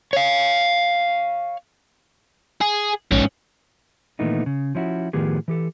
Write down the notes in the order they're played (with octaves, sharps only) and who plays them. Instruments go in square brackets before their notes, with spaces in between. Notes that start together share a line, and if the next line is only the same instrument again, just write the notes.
[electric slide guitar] C#5 F5
[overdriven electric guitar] G#4
[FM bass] A#1 [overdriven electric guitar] G#2 C#4
[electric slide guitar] A#2 D#3 E3 A3 B3 D#4
C#3
F3 C#4 E4 F#4
A2 D#3 F3 B3 G4 G#4
E3 G4 A4